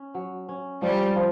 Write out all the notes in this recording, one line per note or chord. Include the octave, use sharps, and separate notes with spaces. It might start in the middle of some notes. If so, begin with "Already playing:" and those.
Already playing: C#4
F#3
C#4
F3 G3
F3